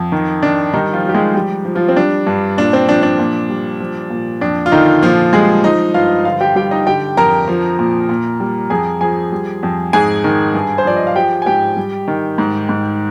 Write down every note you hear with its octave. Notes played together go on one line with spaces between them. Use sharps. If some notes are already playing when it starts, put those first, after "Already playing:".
Already playing: F2
D#3
D#3 D4
D#3 G3 D#4
F3 F4
G3 G4
G#3 G#4
F3 G3 G4
F3
F3 F4
C4
G3 D4
G2
A#2 D4
C4
F3 D4
D4
A#2
G3
F3
A#2
F2 D4
F4
D3 D#3 D#4
A#2 F3 F4
G3 G#3 G#4
F3 D#4 D#5
G2 F4 F5
D3 F4 F5
G4 G5
G3 G4 G5
D#4 D#5
D3 G4 G5
F2 A#4 A#5
F3
A#2
A#2
G3
F2 G#4 G#5
F3 G#4 G#5
G3
F2
G#2 G#4 G#5
D#3
G2
C5
F3 D5
D#5
F5
F3 G4 G5
G#5
G#2 G4 G5
G3
D#3
G#2
G#2